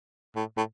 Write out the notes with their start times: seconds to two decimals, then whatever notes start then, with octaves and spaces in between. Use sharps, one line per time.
0.35 A2
0.57 A2